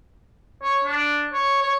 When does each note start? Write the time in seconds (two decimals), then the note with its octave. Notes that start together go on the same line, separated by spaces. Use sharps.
0.63 C#5
0.85 D4
1.33 C#5
1.63 C#5